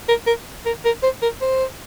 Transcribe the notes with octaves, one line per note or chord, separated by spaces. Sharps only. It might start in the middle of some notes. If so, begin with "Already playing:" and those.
A#4
A#4
A#4
A#4
C5
A#4
C5